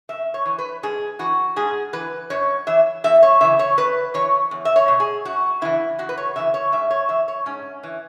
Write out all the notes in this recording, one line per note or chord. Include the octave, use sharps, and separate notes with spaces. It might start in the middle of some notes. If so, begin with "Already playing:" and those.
F#2 E5
C#5
E3
B4
G#2 G#4
E3 F#4
G#2 G#4
E3 B4
F#2 C#5
E3 E5
E2 E5
C#5
C#3 E3 E5
C#5
E2 B4
E3 C#5
E2
E5
C#5
B2
G#4
F#2 F#4
C#3 E3 E4
E2 F#4
B4
C#5
C#3 E3 E5
C#5
G#2 E5
C#5
E3 E5
C#5
G#2 C#4
E3